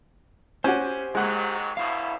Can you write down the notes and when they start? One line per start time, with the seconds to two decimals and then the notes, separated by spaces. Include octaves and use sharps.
0.64 C#4 F#4 G4 C5
1.15 G#2 D#3 F#3 G#3 F#5
1.77 A1 F#2 B2 E4 F5